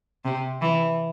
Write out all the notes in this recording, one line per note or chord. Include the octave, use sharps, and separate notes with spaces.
C3
E3